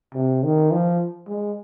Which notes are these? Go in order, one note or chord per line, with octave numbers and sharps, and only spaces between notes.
C3
D#3
F3
G#3